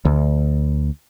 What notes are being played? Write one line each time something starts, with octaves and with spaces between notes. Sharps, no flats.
D2